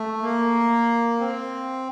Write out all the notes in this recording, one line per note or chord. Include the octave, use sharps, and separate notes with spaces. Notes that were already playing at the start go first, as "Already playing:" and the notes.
Already playing: A3
A#3
C4